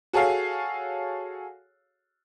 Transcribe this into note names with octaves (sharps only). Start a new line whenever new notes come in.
F#4 G#4 A4 C#5 F5